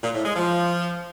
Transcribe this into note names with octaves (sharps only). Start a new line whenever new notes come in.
A#2
A2
G#3
F3